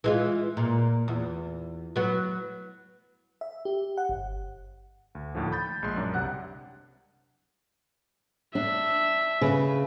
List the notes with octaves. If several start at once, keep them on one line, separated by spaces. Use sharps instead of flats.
E3 G#3 F4
A#2
E2
F#3 B3
E5
G4
F#5
G1
D2
D#2 A2 D3 F3
B5 G6 A6
A#1 G#3 C6
F#2 F#3 D4
C2 C3 F#5 F#6
D4 E5
C#3 B4